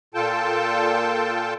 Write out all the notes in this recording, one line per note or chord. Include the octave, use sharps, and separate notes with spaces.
A#2 F4 A4 G5 A5